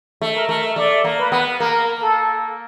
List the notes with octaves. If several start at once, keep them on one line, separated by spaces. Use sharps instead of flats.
A3
A#4
A3
A3 D5
A#3
B4
B3
A#3 A#4
A4